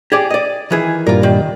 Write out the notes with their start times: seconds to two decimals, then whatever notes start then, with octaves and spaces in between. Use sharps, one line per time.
0.12 G4 G#4 D5
0.30 D5 D#5
0.71 D#3 E3 G#4
1.07 G2 A#2 G3 F4 A#4
1.23 D#3